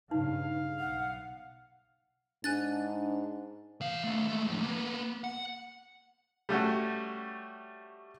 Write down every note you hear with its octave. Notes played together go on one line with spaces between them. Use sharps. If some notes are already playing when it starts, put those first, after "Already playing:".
G2 C#3 D#4 F5
B1 F#5
G#2 D4 G#5 F#6 A6
E3 F5
D#3 A3
G#3 A3
A2 F3
A#3 B3
F#5
G3 A3 C#4 F#4